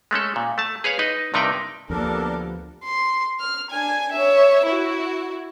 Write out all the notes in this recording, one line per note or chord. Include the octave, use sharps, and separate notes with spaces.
G#3 A3 C#4 A4
A#2
A3 A5
G#4 B4 C#5 F5
D#4 B4 D#5
G2 C3 D#4 A#4 B4 G5
D2 F3 A#3 B3 D4 G4 A4 A#4
C6
F6
D4 G#5
C#5 E5
E4 F#4